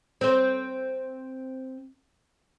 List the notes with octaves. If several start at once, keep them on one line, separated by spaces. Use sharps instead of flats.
C4 C5